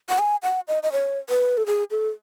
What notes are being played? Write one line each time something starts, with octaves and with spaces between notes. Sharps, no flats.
F#5
G#5
F#5
D#5
D#5
C#5
B4
A4
G#4
A4